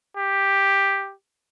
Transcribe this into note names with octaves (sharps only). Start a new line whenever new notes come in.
G4